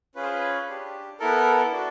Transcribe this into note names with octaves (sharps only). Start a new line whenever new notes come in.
C#4 F4 G#4 B4
C5
B4
D4 G4
B3 E4 A4 A#4
D4 F#4